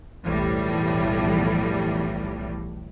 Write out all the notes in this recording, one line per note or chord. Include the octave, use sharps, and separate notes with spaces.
B1 E2 A2 E3 F3 G3